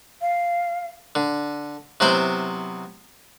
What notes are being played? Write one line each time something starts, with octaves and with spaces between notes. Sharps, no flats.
F5
D3
C3 F#3 B3 E4 C5